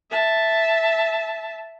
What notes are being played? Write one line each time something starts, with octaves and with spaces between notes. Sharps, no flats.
E5 A5